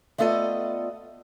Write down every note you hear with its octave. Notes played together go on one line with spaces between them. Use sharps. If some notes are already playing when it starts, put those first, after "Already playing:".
A3 B3 F4 A4 D5 D#5